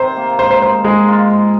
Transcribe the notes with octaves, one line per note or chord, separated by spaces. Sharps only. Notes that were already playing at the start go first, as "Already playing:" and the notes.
Already playing: C3 D#3 D#4 C5
A#3
G#2 C5
C5
G#2 C5
G#2 G#3
F4
G#2